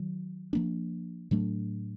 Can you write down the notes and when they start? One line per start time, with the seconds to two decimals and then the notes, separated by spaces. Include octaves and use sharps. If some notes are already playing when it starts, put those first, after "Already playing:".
Already playing: D#3 F#3
0.53 F3 A#3 D4
1.31 A2 F#3 A3 D4